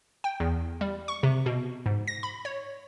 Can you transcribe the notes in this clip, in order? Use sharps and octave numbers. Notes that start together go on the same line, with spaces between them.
G5
E2
G3
C#6
C3
B2
G#2
A#6
B5
C#5